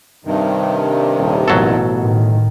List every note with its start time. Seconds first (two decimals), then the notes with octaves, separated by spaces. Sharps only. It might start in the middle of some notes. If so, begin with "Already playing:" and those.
0.25 G2 C3 D#3
1.17 D#1
1.48 A1 B2 F#3 A4
1.95 A2 D#3